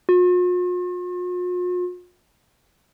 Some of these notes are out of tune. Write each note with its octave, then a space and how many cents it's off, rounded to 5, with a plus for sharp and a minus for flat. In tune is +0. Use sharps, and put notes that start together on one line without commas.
F4 +45